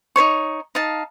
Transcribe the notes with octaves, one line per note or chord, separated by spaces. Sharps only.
D#4 C5 C#5 C#6
D#4 F5 A5